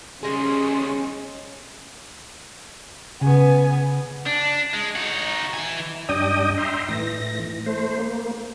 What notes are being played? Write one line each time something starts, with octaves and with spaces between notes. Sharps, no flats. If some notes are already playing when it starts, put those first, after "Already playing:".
C#3 G3 C#4 G#4 D#5 C6
C#3 B3 G#5
D4
G#3
D#4 F#4
E3 G#5
G2 D4 D#5 G5 D#6
E5 G5 A#5 C6
A2 E3 A#6
A3 C5
A#3